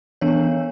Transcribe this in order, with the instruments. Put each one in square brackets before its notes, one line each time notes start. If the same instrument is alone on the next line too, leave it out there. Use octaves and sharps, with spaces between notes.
[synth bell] E3 B3 D4 C#5